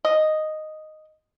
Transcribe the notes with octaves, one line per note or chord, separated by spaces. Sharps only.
D#5